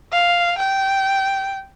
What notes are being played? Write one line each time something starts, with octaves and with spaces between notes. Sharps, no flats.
F5
G5